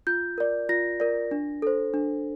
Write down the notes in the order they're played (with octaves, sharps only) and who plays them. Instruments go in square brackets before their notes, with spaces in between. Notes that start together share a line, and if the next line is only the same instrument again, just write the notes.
[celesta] F4 G6
A#4 D5
F4 A#6
A#4 D5
D4
A4 C5
D4